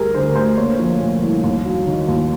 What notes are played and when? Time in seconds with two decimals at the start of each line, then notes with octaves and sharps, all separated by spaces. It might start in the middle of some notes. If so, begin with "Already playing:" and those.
Already playing: D2 G3 G#4 A#4
0.14 D3 C5
0.36 D2 C5
0.58 A#3 C#5
0.79 F3
1.01 A#2
1.22 C2
1.44 D#2
1.65 F#3
1.87 D#3
2.09 D#2